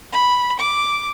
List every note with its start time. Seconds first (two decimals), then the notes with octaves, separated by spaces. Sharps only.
0.12 B5
0.59 D6